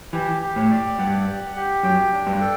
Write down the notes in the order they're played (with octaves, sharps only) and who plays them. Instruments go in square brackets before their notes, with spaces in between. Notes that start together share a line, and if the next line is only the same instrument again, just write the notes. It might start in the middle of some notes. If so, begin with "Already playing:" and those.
[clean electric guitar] E3 [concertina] G4
[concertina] G4
[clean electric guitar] A2
[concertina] D5
[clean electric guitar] G2 [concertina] F#5
[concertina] G4
G4
[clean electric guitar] F#2 [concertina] G5
[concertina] D4
[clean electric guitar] G2
[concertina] A4